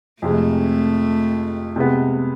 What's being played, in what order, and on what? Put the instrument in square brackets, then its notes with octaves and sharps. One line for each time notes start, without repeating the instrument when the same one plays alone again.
[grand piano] F2 C3 G#3 [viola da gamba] A3
[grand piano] C3 G#3 B3